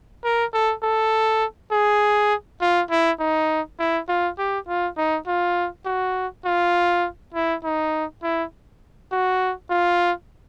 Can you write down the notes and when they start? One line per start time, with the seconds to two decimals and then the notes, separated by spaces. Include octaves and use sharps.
0.24 A#4
0.53 A4
0.83 A4
1.72 G#4
2.61 F4
2.91 E4
3.20 D#4
3.79 E4
4.09 F4
4.39 G4
4.68 F4
4.97 D#4
5.27 F4
5.86 F#4
6.45 F4
7.34 E4
7.64 D#4
8.23 E4
9.12 F#4
9.71 F4